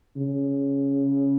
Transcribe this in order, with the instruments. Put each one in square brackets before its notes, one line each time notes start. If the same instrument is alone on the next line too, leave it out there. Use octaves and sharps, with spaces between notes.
[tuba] C#3